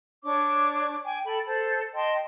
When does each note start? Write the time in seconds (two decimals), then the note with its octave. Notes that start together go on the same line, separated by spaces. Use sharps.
0.24 D4 C#5 C#6 D6
1.05 G5 G#5
1.25 A4 G5 B5
1.46 A4 C5
1.95 D#5 G5 A5 C6